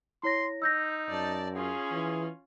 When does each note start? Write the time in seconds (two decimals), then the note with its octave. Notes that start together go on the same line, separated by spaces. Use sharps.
0.23 E4 C#5 C6 A#6
0.62 D#4 E6 G6 A#6
1.09 F#2 D5 A5
1.55 C#4 F4 G#4
1.92 E3